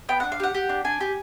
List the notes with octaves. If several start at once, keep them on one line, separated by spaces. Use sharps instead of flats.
B3 G5
D4 F#5
F5
G4 F#5
G4
D4
D4 G#5
G4